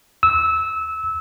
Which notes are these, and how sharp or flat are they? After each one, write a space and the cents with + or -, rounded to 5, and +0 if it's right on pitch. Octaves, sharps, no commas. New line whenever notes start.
E6 -20